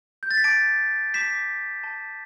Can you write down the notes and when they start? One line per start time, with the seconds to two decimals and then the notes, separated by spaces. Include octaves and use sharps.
0.23 G6
0.31 A6
0.37 B6
0.44 A5 D6 G6 A6 D7
1.14 A5 D6 G6 B6 E7
1.83 A5 G6